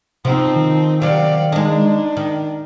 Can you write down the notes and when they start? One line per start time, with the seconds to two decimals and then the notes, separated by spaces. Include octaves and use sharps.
0.25 C3 F3 C4 D#4
0.56 D#3
1.02 C3 F#3 D5 F5
1.52 G#3 D4 D#4 D#5
2.17 D#3